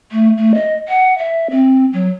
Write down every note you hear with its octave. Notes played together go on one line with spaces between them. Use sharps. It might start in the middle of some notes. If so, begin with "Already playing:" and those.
A3
A3
D#5
F#5
E5
C4
F#3